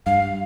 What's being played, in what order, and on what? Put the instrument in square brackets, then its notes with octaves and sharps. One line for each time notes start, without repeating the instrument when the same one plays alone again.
[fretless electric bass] G2 [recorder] F5